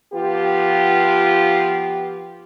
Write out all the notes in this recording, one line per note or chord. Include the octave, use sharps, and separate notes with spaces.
F3 B3 F4 G4